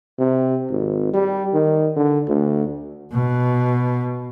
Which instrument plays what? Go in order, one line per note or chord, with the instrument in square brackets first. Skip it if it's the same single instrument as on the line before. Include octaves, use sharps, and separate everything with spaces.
[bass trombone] C3
G#1
G3
D#3
D3
D2
[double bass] B2